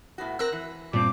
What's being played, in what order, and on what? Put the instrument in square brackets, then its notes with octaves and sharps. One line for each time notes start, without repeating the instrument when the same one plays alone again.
[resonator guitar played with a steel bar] A2 B3 F#4
[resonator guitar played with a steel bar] C4 A#4 [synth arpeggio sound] E6 F#6 A#6
[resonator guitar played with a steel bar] E3
[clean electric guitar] G2 C4 [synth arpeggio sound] A#2 [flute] D6